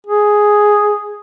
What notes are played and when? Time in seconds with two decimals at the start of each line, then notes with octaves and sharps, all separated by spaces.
0.07 G#4